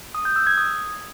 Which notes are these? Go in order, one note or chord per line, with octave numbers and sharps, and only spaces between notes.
D#6
G6
E6
G#6
D#6